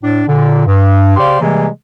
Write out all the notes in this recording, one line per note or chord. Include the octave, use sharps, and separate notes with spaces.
A2 D4
A#2 D3
G2
C#3 G4 C5 D5 F5 C6
C3 E3 G3 G#3 A#3 G#4